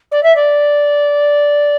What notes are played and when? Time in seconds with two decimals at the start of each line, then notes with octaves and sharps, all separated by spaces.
0.11 D5
0.23 E5
0.35 D5